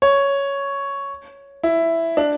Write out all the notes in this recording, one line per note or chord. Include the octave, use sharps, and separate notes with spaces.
C#5
E4
D4